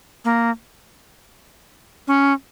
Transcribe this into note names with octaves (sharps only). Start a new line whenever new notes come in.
A#3
C#4